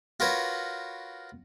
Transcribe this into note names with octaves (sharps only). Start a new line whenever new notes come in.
F4 F#4 A#4 B4 C#5